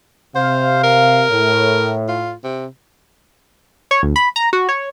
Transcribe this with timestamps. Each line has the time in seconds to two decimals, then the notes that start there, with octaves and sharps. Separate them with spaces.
0.36 C3 C5 F5
0.84 A#4
1.30 A2
2.09 F4
2.44 C3
3.91 C#5
4.03 D2
4.16 B5
4.36 A#5
4.53 F#4
4.69 C#5